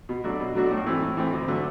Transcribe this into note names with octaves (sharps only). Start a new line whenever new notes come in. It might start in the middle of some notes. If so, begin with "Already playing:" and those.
B2
F#3 A3 D4 F#4
B2
F#3 A3 D4 F#4
A2
E3 A3 C4
A2
E3 A3 C4
D2
D3 F#3 A3